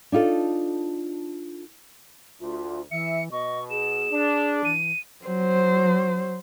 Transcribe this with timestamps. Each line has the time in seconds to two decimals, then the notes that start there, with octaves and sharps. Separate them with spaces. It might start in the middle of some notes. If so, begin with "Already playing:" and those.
0.12 D4 D#4 F4 A4
2.41 D2 F4
2.91 E3 E5 C#7
3.32 B2 D#5 C#6
3.70 G#4 E7
4.11 D4
4.65 E3 D#7
5.26 F#3 C5